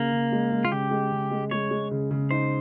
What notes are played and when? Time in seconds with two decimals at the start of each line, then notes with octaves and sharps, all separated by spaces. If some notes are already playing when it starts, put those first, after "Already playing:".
Already playing: C#3 A#3
0.12 C#3
0.32 G#3
0.52 G#3
0.65 F4
0.72 C#3 G4
0.91 G#3
1.12 C#3
1.31 G#3
1.51 G#3 C#5
1.71 G#3
1.91 C#3
2.11 C#3
2.31 D#4 C5